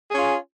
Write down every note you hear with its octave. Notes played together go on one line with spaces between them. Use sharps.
C#4 F4 G#4